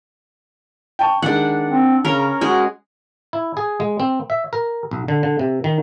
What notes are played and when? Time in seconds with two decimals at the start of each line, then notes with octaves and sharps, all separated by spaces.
0.99 G5 A5 C#6
1.22 D#3 G#3 D4 F#5
1.69 C4
2.05 C#3 C#4 A#4 A#5
2.41 G#3 F#4 G#4
3.33 E4
3.57 G#4
3.80 G#3
4.00 C4
4.30 E5
4.53 A#4
4.91 B1
5.08 D3
5.23 D3
5.39 C3
5.64 D#3